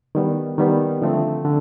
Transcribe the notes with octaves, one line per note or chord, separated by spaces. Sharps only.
D#3 G3 B3
D#3 G3 B3
D3 F3 A3 C4
D3